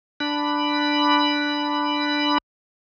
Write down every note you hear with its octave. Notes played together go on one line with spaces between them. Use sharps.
D4 B5